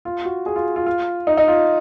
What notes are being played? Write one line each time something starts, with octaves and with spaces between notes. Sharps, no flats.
F4
F#4
G#4
F4
F4
F4
D#4
D#4
F4